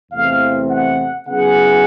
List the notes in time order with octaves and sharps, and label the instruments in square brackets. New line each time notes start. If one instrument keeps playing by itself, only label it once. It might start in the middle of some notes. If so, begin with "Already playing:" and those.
[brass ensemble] E2 C3 E3 A3 C4 [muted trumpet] F5
[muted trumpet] F#5
[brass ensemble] C#3 F#3 B3 E4 G#4 [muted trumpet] F#5